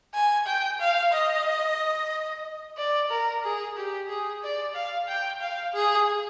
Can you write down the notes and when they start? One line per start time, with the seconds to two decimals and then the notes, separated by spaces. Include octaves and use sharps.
0.14 G#5
0.47 G5
0.80 F5
1.12 D#5
2.78 D5
3.11 A#4
3.44 G#4
3.77 G4
4.09 G#4
4.43 D5
4.75 F5
5.08 G5
5.41 F5
5.74 G#4